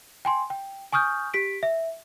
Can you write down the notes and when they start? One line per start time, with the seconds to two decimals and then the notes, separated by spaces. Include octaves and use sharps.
0.25 G5 G#5 C6
0.50 G5
0.93 G#5 C#6 D#6 F6 G6
1.34 G4 B6 D7
1.63 E5